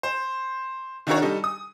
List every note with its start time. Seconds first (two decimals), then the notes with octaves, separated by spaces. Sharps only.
0.03 C5
1.07 D#3 D4 E4 F#4 A#4 C#5
1.22 G3 D#4 A4
1.44 D#6